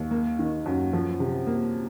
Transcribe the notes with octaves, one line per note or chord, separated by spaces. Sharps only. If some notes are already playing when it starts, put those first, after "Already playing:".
Already playing: D#2
A#3
D#3
F#2
F3
C3
A#3